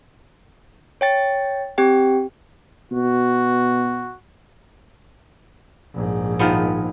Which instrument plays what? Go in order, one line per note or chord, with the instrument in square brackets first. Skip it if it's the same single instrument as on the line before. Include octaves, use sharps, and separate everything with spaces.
[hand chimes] C#5 G5 A6
C4 G4 G5
[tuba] B2 [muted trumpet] F#4
[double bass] A#1 G#2
[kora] D#3 F3 B3